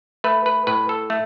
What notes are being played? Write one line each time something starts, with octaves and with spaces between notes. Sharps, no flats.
A3 B4
B4
A2 B4
A4
A3